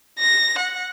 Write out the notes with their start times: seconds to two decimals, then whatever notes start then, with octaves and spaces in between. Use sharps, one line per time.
0.19 A#6
0.59 F#5